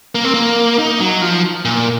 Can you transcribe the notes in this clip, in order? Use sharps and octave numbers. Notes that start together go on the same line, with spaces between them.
A#3
C4
A#3
D#4
F#3
F3
A#2